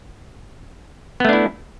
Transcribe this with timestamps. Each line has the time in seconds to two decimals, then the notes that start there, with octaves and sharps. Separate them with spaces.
1.20 B3
1.25 A3
1.29 D4
1.33 E4